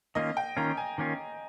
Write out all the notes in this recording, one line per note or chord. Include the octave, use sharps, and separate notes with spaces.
D#3 A#3 C#4 F4 D#5
G5
D#3 A#3 C#4 F4 A#5
G#5
D#3 A#3 C#4 F4